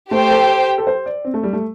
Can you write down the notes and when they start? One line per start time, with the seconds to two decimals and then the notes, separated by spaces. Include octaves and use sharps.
0.11 A3 G4 C5 G5
0.31 A4
0.78 A4
0.87 C5
1.06 D5
1.25 C4
1.34 A3
1.43 G3
1.53 A3